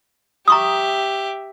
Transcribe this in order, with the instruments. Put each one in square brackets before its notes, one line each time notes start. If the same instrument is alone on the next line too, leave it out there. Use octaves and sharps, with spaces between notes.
[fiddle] G4 E5 [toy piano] A#5 C#6 D#6